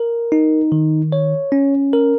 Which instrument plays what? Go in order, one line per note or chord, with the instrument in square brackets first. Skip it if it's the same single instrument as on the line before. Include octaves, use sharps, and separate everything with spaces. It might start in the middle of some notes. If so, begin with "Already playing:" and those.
Already playing: [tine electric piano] A#4
D#4
D#3
C#5
C#4
A#4